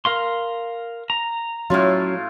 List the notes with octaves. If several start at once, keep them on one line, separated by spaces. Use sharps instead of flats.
A#4 F5 C6
A#5
A2 F#3 C#4 F4